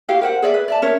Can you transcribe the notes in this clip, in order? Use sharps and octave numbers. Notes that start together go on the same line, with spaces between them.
E4 F#4 G4 F5
A#4 C5 F#5
G#4 D5 E5
B4
D5 E5 A5
C#4 A#4 C#5 E5